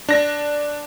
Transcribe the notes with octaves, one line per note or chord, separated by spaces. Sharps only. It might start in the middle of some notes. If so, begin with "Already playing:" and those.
D4 A#6